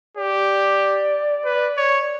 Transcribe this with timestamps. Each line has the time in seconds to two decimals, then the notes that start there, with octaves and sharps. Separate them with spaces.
0.17 G4 D5
1.45 B4
1.77 C#5